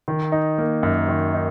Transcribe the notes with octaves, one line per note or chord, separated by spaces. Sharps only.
D#3
D#4
A#3
F#2
D#3
D#4